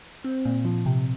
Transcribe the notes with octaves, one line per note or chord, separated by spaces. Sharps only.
C4
A#2
F3
C3